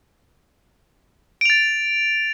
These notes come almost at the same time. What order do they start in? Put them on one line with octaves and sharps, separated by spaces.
D7 F7 A6